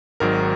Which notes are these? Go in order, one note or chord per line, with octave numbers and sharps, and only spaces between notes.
G#1 G#2 D#3 F#3 A#4